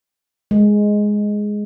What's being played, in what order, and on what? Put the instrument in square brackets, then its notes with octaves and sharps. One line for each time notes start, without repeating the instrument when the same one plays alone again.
[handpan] G#3